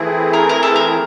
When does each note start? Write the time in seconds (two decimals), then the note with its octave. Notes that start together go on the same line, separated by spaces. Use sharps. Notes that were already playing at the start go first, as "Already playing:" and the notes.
Already playing: E3 A3 C4 E4 G#4
0.33 A#4
0.49 A#4
0.63 A4
0.76 A#4